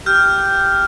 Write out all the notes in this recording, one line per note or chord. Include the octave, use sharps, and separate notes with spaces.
G4 F6 G6